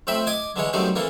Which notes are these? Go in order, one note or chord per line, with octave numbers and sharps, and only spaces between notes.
F2 A2 C4 E5 B5
D#5 G#5 D6 D#6
D3 E3 G#3 C#5
F#2 B2 G3 A3 C4 D#4
A#1 F2 E3 A#3 A4